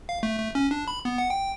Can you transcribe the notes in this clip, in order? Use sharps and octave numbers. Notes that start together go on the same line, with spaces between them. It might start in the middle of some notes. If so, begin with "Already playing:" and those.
F5
A3
A3
C#4
D4
B5
B3
F#5
G5